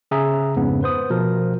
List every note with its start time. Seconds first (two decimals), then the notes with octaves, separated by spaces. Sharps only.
0.11 C#3 G#4 E5 A#5
0.56 F2 G#2 C#3 B3
0.83 B4 C5 D#6
1.10 B2 F3 A#4